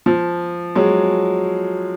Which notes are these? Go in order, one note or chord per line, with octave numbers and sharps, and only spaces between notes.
F3
F#3 G#3